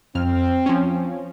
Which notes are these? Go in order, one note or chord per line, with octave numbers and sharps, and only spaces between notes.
F2 C4 F6
F3 C#4